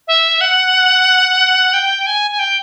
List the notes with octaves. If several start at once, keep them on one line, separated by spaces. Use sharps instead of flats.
E5
F#5
G5
G#5
G#5
G5